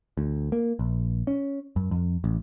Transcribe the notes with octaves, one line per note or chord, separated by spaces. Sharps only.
D2
A#3
A#1
C#4
F#2
F2
A1